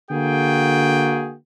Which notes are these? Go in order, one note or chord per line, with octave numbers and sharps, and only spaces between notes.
D3 A#3 F#4 G#4 G5